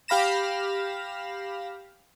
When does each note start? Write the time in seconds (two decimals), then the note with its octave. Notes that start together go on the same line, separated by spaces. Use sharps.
0.08 G4 F5 B5 A#6 E7